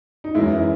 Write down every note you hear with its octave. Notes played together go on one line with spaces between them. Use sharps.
D#4
F#2 E3 G#3 E4